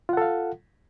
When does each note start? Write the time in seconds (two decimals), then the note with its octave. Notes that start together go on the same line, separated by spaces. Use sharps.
0.09 F4
0.13 F#5
0.17 A4
0.22 F5